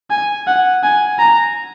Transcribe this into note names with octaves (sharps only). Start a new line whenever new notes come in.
G#5
F#5
G#5
A#5